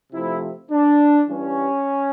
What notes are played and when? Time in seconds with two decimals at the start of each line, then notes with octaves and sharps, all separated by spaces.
0.13 C3 F3 A3 E4
0.71 D4
1.28 G2 E3 G3 C#4